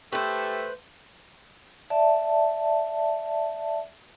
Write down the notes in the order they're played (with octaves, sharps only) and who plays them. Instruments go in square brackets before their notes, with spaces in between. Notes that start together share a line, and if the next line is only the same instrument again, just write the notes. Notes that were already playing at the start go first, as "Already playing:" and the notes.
[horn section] A3 [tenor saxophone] G4 [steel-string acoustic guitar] B4 C5
[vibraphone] D5 E5 A5